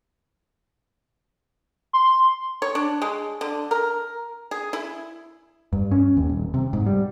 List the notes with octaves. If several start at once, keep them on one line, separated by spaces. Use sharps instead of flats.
C6
C#5
D4
G#3
D3
A#4
G#4
E4
G2
C#4
D#2
D#1
C3
G#2
G3